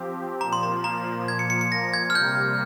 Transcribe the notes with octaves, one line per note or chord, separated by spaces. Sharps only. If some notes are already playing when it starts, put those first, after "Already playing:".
Already playing: F3 C4 G4
A#2 F3 A#3 A#5
C6
A#5
A#5
G#6
C#7
C#7
C#7
A#6
G#6
F6
C3 G3 A#3 G6